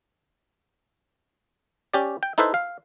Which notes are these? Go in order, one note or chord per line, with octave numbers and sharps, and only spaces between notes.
C#4 G4 D5
G5
D#4 E4 A4 B4 C5 E5
F5